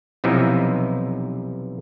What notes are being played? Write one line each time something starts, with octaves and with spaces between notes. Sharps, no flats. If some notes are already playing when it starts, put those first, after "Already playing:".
B1 C3 E3 F3 D#4